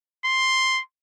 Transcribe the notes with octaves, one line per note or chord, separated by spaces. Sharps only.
C6